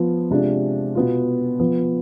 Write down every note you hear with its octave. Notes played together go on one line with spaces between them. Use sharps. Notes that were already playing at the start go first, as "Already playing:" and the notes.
Already playing: F3 B3 F4
C3 G#3 D4 F4
B2 B3 F4
F3 B3 F4